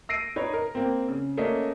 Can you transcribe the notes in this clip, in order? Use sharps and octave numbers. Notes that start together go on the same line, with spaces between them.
E6 A#6 C7 D7 D#7
D#4 B4 C#5
A#4
A#3 C4
C#3
A3 A#3 C#4 D#5